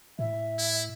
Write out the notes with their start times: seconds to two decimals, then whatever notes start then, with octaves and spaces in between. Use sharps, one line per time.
0.19 A2 E5
0.58 E4